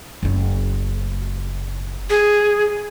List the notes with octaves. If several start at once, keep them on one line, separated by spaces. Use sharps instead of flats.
F#1 C#4
G#4